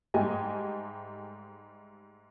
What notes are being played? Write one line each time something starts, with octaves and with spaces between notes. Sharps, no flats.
G#2 G3 A3 G4 D#5 G#5